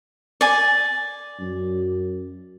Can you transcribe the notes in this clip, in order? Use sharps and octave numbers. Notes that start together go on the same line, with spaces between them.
D5 G#5
F#2